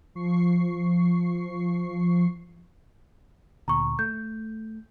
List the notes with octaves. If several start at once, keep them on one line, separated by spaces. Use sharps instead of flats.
F3 C#6 C7
D2 A#2 A#5 C#6
A3 G6